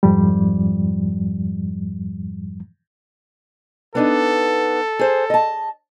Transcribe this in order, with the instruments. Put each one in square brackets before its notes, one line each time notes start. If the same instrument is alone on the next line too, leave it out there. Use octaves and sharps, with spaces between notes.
[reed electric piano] F2 G#2 F3 G3
[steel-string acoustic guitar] B3 D4 D#4 [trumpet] A4
[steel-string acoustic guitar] G#4 C5
D#5 A5